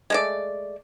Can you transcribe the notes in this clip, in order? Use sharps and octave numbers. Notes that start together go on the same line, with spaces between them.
G#3 A3 D5